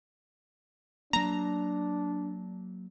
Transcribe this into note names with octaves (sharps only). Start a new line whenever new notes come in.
F#3 A#3 D4 A#5